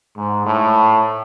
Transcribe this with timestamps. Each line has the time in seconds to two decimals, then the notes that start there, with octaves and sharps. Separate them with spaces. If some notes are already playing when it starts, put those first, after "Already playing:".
0.16 G#2
0.45 A2